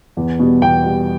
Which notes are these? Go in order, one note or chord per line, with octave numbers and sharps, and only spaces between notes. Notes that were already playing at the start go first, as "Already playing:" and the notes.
E2
B2 G3
E2 G5
B2 G3